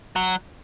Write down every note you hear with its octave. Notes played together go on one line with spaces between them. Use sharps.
F#3